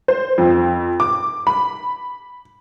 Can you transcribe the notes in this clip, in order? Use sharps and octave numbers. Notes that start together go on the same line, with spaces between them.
C5
F2
D6
B5